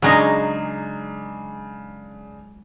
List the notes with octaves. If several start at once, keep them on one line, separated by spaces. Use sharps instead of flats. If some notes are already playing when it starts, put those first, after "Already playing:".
C#3 F#3 G#3 D4 D#4